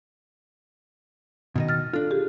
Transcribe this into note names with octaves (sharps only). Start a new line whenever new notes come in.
B2 D#3 D#5
F6 A6
D4 F4 A4
G4 G#4